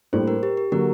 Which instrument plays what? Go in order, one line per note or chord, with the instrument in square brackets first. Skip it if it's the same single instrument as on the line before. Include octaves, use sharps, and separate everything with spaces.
[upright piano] A2 G3 A#3 D4 [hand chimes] C5
[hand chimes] A#4
G4
G4
[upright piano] D3 F#3 A#3 [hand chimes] A#4